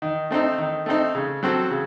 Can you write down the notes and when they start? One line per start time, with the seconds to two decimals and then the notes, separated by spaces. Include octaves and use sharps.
0.02 D#3
0.31 A3 C4 D#4
0.58 D#3
0.86 A3 C4 D#4
1.15 C#3
1.43 F#3 C4 F#4 A4
1.70 C#3